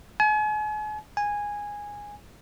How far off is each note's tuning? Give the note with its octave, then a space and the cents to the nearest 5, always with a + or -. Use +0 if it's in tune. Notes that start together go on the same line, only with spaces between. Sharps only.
G#5 +40
G#5 -10